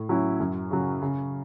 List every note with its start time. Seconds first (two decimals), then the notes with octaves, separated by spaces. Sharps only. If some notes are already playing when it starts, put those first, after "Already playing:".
Already playing: A2
0.09 F#3 C#4 E4
0.40 F#2
0.71 C#3 F#3
1.02 C#3